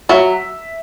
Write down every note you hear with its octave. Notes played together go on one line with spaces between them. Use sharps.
F#3 E5